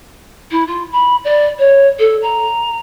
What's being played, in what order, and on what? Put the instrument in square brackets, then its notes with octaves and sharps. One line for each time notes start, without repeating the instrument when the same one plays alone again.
[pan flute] E4
F4
B5
D5
C#5
A4
A#5